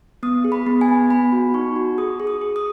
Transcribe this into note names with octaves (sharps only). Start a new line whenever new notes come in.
B3 D#6
G#4
B5
B3
G#5
B3
B3 B5
F#4
D#4 C#6
F#4
G#4 D#6
G#4
D#6
G#4
D#6